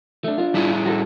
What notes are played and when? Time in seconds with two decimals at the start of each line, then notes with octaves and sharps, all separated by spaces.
0.24 A3 D4
0.38 D4 F4
0.54 G3 E4 G#4
0.86 F#4 A4